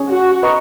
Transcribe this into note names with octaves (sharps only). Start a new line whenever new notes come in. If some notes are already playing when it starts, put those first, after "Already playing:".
Already playing: C#4 G#4 C#5
F#4
B4 D#5 A#5 C#6